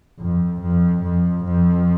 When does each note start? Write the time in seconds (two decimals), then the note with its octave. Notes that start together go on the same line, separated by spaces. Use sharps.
0.19 F2
0.61 F2
1.03 F2
1.45 F2